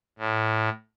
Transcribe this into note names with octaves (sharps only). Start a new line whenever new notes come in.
A2